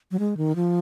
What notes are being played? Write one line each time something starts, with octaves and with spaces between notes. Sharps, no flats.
F#3
G#3
D#3
F3